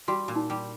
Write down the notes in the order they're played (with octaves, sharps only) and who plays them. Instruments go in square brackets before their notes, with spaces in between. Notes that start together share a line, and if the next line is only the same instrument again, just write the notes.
[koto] G3 [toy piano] F#4
[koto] A#2
[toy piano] D#4
[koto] G3